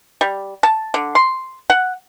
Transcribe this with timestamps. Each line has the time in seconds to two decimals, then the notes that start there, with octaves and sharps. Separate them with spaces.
0.21 G3
0.63 A5
0.94 D3
1.15 C6
1.70 F#5